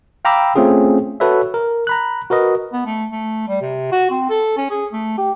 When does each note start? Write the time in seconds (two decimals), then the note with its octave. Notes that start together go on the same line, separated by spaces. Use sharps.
0.25 F5 G5 A#5 B5 D6 E6
0.55 A3 C4 C#4 F4 G#4
1.20 F#4 A4 B4 C#5 E5
1.54 A#4
1.87 A#5 B5 F#6
2.30 F#4 A#4 B4 D#5
2.72 B3
2.86 A3
3.11 A3
3.48 G3
3.61 C3
3.92 F#4
4.11 C4
4.30 A4
4.57 C#4
4.70 G#4
4.92 A3
5.18 G4